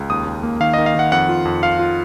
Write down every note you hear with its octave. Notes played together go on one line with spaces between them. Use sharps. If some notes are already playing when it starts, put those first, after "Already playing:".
Already playing: C#2
D#2 D#6
D#2
A#3
D#3 F5
D#3 D#5
F5
D#3 F#5
F2 F#5
F4
F2
F4 F5
F4